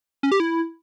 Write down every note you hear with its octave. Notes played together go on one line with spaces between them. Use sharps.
C#4
G4
E4